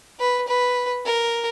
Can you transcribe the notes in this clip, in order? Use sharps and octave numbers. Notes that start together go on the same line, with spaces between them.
B4
B4
A#4